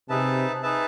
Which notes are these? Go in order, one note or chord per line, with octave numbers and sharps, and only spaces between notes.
C3 D#4 G#4 B4 E5 A5
D#4 G#4 B4 E5 A5